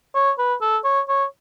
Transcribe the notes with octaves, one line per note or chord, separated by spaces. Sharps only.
C#5
B4
A4
C#5
C#5